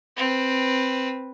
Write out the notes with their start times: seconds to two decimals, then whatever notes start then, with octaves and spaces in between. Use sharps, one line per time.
0.17 C4 B4